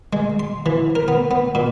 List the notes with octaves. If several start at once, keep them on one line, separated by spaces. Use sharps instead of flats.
G#3
C6
E3
A#4
B3
B3
A#2